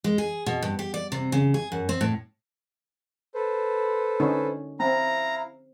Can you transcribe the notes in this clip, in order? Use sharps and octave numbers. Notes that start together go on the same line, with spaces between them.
G#3
G#4
B2
G2
G4
D5
C3
C#3
G#4
F#2
C4
A2
A4 B4 C5
D3 C#4 D#4
C4 E4 F5 A#5